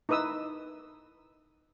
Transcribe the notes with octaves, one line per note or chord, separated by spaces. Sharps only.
D#4 E4 B4 D#6 E6